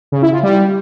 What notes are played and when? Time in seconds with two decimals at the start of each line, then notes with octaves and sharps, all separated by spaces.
0.12 C#3
0.22 E4
0.33 F4
0.43 G3